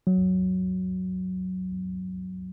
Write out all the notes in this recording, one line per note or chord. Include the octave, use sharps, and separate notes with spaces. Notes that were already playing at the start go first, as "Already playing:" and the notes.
F#3